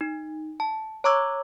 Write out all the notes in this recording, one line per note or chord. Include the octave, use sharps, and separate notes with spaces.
D#4
A5
C#5 A#5 C#6 D6 E6 G#6